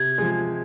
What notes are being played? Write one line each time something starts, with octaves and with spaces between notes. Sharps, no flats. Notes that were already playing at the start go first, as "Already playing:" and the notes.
Already playing: C3 G#6
F3 G#3